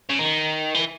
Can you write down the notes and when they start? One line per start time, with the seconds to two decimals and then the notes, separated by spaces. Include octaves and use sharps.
0.10 C#3
0.19 D#3
0.74 E3